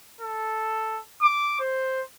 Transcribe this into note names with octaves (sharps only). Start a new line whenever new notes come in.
A4
D6
C5